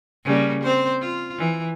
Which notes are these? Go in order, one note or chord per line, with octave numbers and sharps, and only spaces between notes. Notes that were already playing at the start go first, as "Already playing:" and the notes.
C#3 G3 A#3
C4 C5
F4
E3